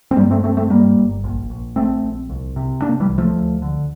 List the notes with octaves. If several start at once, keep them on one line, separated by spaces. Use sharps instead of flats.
C4
G2 G3 A#3
A3 C4
G2 A3 C4
A3 C4
G2 G3 A#3
G1
A#1
A#1
A#1 A3 C4
A#1
C2
C3
C3 A#3 D4
E3 G3
C2
F3 A3
D2
D3